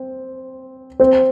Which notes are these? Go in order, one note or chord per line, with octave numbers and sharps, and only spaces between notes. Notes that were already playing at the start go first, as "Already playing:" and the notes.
Already playing: C4 C5
C4 C5